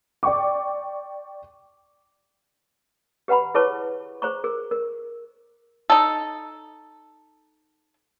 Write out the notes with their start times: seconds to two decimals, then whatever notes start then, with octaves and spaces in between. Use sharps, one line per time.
0.23 D5 G5 C#6 D6
3.28 G4 B4 F#5 A#5 B5
3.55 E4 G#4 B4 C#5 A5 C#6
4.22 G#4 C5 A#5 C#6
4.44 G#4 A#4
4.71 A#4
5.90 D#4 A4